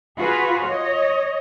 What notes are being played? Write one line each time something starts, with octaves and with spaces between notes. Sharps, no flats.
F4 F#4 G#4 B4
C#5 D#5